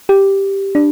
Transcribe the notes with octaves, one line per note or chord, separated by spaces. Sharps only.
G4
D4